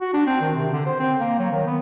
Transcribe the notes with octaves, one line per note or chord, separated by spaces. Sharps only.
F#4
D4
C4
D#3
C3
D3
C5
C4
A#3
F#3
D#3
B3